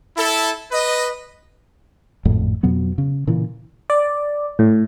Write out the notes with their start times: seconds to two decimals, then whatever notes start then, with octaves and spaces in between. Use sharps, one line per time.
0.17 E4 A4
0.72 B4 D#5
2.25 G#1 F2 A2
2.63 F2 B2 F#3 B3
2.98 C#3
3.27 A#2 C#3 E3
3.90 D5
4.59 A2